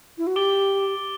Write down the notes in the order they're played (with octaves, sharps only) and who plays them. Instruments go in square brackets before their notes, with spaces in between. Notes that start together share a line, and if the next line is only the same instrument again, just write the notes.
[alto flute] E4
F#4
[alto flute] G4 [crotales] D6 A6 D7 G7